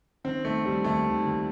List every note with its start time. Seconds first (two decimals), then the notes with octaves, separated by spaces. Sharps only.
0.24 D#3 C4
0.44 D#3 A3
0.65 D#3 G3
0.84 D#2 A3
1.04 D#3
1.25 D#2